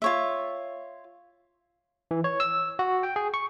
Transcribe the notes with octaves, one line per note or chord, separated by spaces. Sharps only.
F4 C#5 E5
E3
C#5
E6
F#4
G5
G#4
C#6